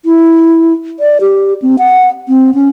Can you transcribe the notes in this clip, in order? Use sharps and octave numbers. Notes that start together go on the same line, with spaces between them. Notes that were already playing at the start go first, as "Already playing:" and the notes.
E4
D5
G4
C4
F#5
C4
C#4